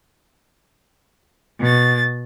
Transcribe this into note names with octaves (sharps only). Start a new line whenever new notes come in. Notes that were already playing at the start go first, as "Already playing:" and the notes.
B2 A6